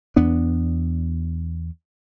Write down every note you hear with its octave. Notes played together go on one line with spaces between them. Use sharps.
E2 B3 D4